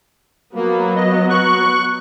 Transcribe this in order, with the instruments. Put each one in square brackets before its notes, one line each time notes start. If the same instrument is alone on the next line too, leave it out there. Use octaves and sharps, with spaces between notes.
[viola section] F#3 B3 [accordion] A#3
[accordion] D#5
C#6 F#6